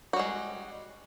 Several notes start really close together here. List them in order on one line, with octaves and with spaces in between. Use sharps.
F#4 G3 G#3